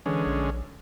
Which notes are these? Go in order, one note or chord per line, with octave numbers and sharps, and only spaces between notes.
D3 E3 G#3 C#4
A#1